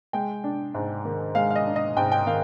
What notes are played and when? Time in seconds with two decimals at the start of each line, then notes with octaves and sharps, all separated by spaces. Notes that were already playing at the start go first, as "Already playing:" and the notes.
0.13 G#3 G5
0.44 D4
0.75 G#2
1.05 D#3
1.35 G#3 F5
1.51 F5
1.56 D#5
1.66 D4
1.76 D#5
1.97 G#2 G5
2.12 G5
2.27 D#3 F5